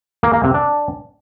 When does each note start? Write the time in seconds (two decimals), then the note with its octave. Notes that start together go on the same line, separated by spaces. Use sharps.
0.23 A#3
0.33 A#3
0.44 C3
0.54 D4